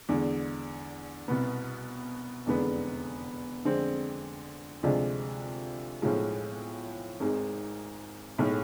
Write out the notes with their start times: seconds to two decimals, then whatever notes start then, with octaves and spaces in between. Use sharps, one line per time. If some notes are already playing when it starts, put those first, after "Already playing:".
0.09 E2 D3 G#3
1.28 C2 B2 B3
2.46 F1 E2 D3 G#3 B3
3.65 F2 D3 G#3 C4
4.83 D2 C3 F3 G#3 D4
6.02 B1 A2 F3 G#3
7.20 G#1 G#2 G#3
8.38 B1 A2 G#3